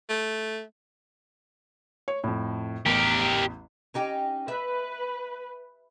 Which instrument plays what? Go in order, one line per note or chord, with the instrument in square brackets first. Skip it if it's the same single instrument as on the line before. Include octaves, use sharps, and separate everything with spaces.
[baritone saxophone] A3
[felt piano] C#5
F2 A2
[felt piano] A1 E2 [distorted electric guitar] G4 A#4
[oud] C#4 D#4 G4
[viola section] B4 [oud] E5